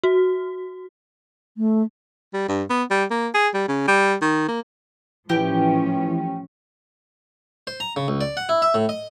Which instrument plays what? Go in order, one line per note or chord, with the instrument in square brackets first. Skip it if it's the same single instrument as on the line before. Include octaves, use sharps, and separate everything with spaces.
[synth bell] F#4
[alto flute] A3
[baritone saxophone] G3
G2
B3
G3
A#3
G#4
G3
C#3
G3
D#3
A#3
[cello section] A2 F3 C#4 [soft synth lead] E3 [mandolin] G4 G5
[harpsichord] C5
A#5
C#3
C#2
D5
F#5
E4
E5
A2
D#5